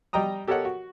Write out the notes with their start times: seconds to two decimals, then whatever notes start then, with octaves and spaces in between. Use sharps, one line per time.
0.13 G3 D#5 G5 A#5 D#6
0.48 G4 A4 A#4 C#5 D#5 F#5
0.65 F#4